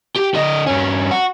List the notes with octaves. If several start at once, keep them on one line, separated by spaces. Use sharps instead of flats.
G4
D3 D#5
G2 C#4
F#4